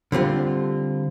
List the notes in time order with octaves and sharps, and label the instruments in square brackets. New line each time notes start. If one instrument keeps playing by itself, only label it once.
[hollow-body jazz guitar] D3 G3 C4 F4